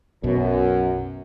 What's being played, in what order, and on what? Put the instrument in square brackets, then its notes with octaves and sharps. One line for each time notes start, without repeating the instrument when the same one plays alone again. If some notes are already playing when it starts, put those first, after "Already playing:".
[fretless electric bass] B1 B2 [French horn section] F#2